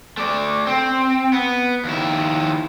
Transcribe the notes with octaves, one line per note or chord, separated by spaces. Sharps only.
A3 D5
C4
B3
D#2 E4